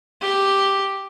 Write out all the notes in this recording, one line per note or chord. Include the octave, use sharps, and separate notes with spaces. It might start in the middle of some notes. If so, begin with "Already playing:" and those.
G4